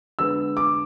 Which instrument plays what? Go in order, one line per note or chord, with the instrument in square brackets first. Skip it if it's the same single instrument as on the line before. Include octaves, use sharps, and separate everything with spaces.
[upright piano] D3 G#3 B3 E6
D6